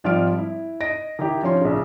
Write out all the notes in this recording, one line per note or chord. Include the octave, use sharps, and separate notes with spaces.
G#1 F3 G3 F4 F6 D7
E4
D#5 A#6 D7
D#3 E4 G4
F3 C#4 C6
A#1 C#3